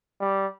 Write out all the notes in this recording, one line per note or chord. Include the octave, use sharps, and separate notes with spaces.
G3